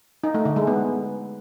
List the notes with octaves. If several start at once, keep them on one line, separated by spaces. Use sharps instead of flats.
D#4
A3
D3
G#3
B3